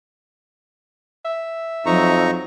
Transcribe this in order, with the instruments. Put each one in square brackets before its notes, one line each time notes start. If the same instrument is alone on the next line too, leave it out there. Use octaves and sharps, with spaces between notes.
[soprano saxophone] E5
[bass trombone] F2 [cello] F#3 [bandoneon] D#4 A#5 C#6